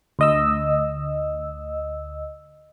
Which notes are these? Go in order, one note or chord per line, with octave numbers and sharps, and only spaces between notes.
D2 D#5 E6